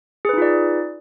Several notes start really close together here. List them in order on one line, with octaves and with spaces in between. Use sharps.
G#4 B4 D#4 F4 D5